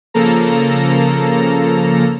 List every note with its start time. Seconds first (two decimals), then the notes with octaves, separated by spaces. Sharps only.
0.14 C#3 F3 A#3 A4 A#5